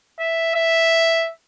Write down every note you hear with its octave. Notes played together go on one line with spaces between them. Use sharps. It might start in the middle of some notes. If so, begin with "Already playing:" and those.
E5
E5